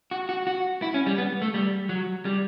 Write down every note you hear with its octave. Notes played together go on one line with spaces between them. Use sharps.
F#4
F#4
F#4
E4
C#4
G3
B3
A3
G3
F#3
G3